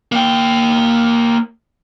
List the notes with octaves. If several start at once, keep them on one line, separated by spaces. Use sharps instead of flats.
A#3 G5